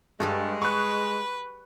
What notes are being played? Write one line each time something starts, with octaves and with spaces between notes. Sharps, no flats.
G2 G3 G#3 G#4 A4
B4 C#6 F#6